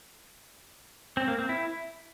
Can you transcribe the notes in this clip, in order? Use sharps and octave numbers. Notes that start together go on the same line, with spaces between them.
C4
A#3
C4
E4